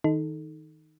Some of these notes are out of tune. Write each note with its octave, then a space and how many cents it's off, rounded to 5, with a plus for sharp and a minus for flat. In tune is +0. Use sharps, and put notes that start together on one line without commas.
D#3 +10 D#4 +0 A4 +0